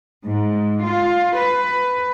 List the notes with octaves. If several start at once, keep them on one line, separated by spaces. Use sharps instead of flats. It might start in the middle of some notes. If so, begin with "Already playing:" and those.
G#2
F4
B4